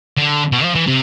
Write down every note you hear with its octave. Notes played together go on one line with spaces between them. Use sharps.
D3
B2
F3
E3
C3